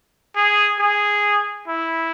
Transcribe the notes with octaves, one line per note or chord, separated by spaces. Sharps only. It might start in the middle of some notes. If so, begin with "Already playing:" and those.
G#4
G#4
E4